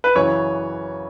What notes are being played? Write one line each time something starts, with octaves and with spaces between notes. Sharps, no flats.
B4
F#2 C#3 E3 C#5